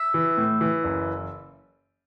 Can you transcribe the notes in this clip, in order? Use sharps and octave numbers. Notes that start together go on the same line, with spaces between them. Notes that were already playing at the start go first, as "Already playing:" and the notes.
Already playing: E5
E3
A2
E3
F#1